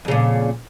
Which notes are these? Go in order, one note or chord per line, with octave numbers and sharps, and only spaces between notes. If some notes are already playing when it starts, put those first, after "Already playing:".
F2 A#2 C#3